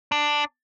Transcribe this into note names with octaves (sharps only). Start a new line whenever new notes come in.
D4